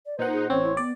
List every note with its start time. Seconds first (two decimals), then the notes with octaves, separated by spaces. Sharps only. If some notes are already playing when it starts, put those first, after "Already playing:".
0.06 D5
0.19 A#2 D#4 B4 C5 F#5
0.33 G#4
0.50 A1 C4 C#4 C#5
0.64 E4
0.77 B3 D5